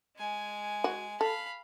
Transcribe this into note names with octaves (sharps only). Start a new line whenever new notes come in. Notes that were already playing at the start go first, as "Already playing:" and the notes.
G#3 G#5
F#4
A4 F5 B5